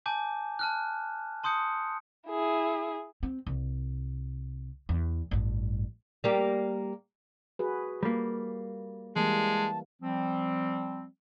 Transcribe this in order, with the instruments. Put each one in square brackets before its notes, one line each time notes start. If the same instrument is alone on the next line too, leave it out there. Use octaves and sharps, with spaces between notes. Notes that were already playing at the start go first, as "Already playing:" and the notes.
[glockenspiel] G#5 A5 D6 G6
A5 F6 F#6
A5 C6 D#6 G6 C#7
[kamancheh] E4 G#4
[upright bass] C4
C2
E2
A1 G2
[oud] G3 A#3 G4
[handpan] F#4 G#4 B4
[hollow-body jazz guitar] G3 A#3
[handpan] E3 G3 A#3 [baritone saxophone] G#3 [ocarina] A5
[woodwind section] F3 G3 C4